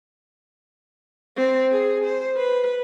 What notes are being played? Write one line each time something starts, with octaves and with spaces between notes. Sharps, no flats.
C4
G#4
C5
B4